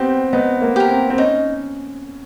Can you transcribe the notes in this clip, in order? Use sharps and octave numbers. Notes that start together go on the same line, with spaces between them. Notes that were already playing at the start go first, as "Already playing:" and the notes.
Already playing: B3 C4 G4
B3 D#4
A#3
G4 A#4
C4
C4
C#4 D#4